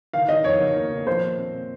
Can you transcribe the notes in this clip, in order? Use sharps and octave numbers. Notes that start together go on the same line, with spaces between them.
D#3 F5
D#3 D#5
F2 C#5
D#3
A#3
D#3
F3 C5
A#2
C4
A#2